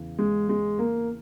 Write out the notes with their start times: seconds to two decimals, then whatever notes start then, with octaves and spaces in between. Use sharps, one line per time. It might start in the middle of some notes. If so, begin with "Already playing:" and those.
Already playing: E2 C#3 E3
0.19 G#3
0.49 G#3
0.79 A#3